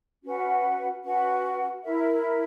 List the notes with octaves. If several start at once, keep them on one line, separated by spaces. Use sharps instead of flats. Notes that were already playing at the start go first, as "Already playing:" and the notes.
C#4 F#4 B4 F#5
C#4 F#4 B4 F#5
E4 A#4 E5